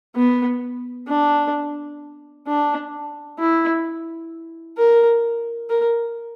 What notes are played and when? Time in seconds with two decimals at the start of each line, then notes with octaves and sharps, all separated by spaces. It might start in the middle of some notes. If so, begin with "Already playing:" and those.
0.16 B3
1.08 D4
2.47 D4
3.39 E4
4.78 A#4
5.70 A#4